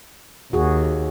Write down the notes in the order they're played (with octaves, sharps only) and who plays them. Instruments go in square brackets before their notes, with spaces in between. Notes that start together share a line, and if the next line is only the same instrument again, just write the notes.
[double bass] D#2 [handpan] F#4 G#4